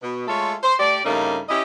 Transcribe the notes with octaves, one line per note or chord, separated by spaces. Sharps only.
B2
G#3 A3 F4 A4 C#5
C5
A3 G4 D5
G2 C#3 A3 A#3 D#4
C#4 E4 G4 D#5